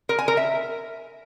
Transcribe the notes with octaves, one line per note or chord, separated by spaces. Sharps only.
A#4
G#5
A#4
E5